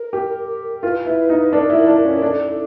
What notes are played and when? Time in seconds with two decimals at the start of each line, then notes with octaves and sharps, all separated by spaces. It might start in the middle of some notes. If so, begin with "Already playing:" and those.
Already playing: A#4
0.13 G4
0.83 F4 B4
1.05 E4
1.29 D#4
1.53 D4 A#4
1.70 E4
1.87 D4
2.05 C#4
2.22 D4 A4